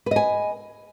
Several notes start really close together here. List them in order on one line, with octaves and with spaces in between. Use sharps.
B4 D#5 G#5